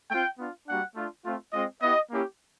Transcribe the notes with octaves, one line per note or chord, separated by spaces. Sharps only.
A3 C4 F4 G5
B3 D4 F4
G3 A#3 D4 F#4 F#5
A3 D4 F4
A3 C4 F4
G#3 C4 F4 D#5
B3 E4 G4 D#5
A#3 C#4 E4 G4